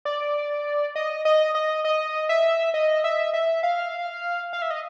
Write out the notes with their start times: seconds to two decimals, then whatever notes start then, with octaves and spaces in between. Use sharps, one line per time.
0.05 D5
0.95 D#5
1.25 D#5
1.55 D#5
1.85 D#5
2.29 E5
2.74 D#5
3.04 E5
3.33 E5
3.63 F5
4.53 F5
4.62 E5
4.70 D#5